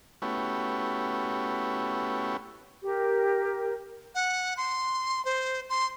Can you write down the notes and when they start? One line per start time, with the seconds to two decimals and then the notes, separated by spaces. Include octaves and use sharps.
0.22 A3 B3 C#4 E4 F#4 G4
2.83 G4 A#4
4.15 F#5
4.57 C6
5.25 C5
5.70 C6